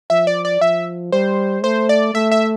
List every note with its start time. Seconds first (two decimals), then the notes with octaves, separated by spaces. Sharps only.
0.10 F3 E5
0.27 D5
0.45 D5
0.61 F3 E5
1.12 G3 C5
1.63 A3 C5
1.89 D5
2.14 A3 E5
2.32 E5